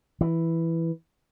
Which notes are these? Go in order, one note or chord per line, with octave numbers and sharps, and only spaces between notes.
E3